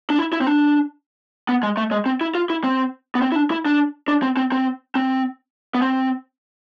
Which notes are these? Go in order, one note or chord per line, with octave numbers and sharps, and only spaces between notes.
D4
E4
E4
C4
D4
B3
G#3
A3
G#3
C4
E4
F4
E4
C4
B3
C4
E4
D4
E4
D4
D4
C4
C4
C4
C4
B3
C4